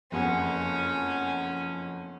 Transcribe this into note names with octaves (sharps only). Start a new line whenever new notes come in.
F#1 F2 B3 C#4